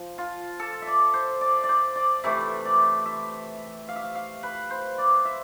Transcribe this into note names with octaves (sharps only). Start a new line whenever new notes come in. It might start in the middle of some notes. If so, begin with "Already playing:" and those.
Already playing: F3
F4
A4
E5
D5
C5
D5
D5
C5
D5
C3 E3 A3 E5
D5
E5
F5
E5
F5
F5
B4
C5
D5
E5